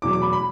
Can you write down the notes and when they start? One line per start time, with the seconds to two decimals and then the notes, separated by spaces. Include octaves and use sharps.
0.02 E2 B2 F#3 D6
0.13 D6
0.22 B5
0.33 B5